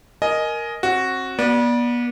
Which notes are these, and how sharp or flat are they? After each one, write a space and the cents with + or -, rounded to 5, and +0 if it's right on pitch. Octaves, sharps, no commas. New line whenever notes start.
A#4 +0 D#5 +0 G#5 +20
C4 +35 F#4 +0
B3 -35 D5 +0